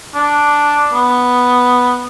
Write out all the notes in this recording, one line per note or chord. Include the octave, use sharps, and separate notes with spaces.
D4
B3